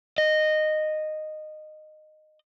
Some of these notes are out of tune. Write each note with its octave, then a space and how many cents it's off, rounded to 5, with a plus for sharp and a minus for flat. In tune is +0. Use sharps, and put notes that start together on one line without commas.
D#5 -15